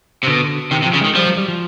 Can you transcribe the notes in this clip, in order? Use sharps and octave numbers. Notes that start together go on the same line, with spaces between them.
C3
B2 D3
C3 D#3
C3
F3
C#3
D#3 G#3
F3 G3
F#3
G3
F3